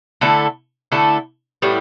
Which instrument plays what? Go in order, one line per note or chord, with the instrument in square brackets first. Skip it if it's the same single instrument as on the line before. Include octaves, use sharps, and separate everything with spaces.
[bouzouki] D3 A3 E4 A4
D3 A3 E4 A4
A2 G3 B3 E4